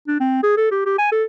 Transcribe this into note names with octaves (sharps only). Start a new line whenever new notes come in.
D4
C4
G#4
A4
G4
G4
G#5
A4